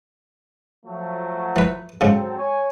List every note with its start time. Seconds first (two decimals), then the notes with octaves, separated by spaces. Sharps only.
0.86 F3 F#3 A3
1.56 E3 B4
2.01 G#2 C#3 F#3 C4 A4
2.38 C#5 G#5